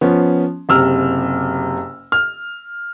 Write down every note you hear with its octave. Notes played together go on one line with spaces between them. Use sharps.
F3 B3 C#4
F#1 C3 E6 F6
F6